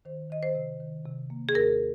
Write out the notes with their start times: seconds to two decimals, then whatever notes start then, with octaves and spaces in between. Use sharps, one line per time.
0.05 D#3 C5
0.30 D#3 D#5
0.43 C5
0.55 C3
0.80 D#3
1.05 C3
1.30 A#3
1.49 G#4
1.55 D#2 A#4